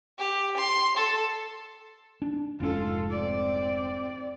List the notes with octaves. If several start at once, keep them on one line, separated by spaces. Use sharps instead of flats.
G4
C6
A4
D4
F1 G#2 C#4 F4 A4
C4 D5